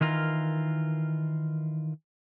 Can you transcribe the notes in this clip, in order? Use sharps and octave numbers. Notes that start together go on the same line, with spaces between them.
D#3 E3 F4 A#4